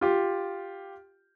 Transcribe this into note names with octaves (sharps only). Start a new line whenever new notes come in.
F4 G4